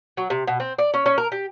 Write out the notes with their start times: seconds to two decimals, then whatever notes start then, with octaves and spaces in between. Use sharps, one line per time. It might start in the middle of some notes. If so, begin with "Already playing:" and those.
0.17 F#3
0.30 C3
0.47 B2
0.60 C4
0.78 D5
0.94 C#4
1.06 C#4
1.18 A#4
1.32 G4